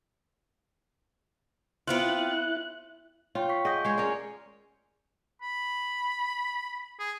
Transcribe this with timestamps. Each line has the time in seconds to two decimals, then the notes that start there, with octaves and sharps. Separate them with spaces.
1.88 B3 C4 E4 F4 F#6
3.35 F4 C#5 G5
3.49 C#6 B6 C7
3.65 G#4 D#5 F#5 G6
3.85 G#3 C5 C#5 C#6
3.98 C#4 A#4 D5
5.42 B5
7.00 G#4